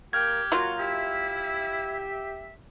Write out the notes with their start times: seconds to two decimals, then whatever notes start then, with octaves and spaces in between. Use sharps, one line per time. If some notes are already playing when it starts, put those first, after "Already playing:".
0.13 A#3 G4 A#4 G5 F6 G#6
0.52 F#3 A#3 F4 F#4
0.79 E4 G4 E5